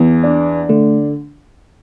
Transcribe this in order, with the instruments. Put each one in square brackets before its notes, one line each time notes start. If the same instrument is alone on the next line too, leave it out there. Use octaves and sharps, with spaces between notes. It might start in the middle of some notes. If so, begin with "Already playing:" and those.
Already playing: [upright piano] E2 [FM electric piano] B3
[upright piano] D4
[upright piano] D3 [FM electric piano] A3